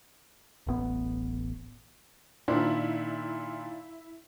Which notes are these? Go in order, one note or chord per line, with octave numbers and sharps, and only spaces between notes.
D1 A1 B3
A#2 D#3 D4 E4